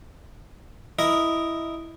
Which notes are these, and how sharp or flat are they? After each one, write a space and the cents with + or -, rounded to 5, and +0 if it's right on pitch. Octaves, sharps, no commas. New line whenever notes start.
E4 +0 A#4 +0 D#5 +0